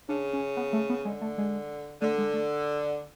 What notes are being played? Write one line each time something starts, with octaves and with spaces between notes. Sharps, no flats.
C#3 D4
C#4
B3
A3
B3
D3 G#3
A3
G#3
D3 A3
G#3
A3